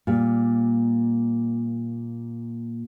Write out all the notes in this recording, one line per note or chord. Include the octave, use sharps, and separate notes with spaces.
A#2 G3